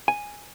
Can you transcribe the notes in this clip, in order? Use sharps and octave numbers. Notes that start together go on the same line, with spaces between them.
G#5